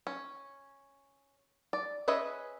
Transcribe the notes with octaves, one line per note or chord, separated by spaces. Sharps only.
C#4
D5
C#4 G#4 B4 D#5 E5